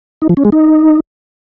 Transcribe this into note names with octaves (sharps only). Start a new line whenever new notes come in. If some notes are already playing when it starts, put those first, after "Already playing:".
D#4
F3
C#4
G#3
D#4